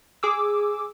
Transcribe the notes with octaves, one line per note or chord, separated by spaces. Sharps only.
G#4 D6 E6